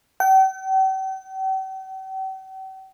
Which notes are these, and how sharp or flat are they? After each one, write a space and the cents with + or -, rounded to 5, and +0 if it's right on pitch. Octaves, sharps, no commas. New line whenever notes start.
G5 -45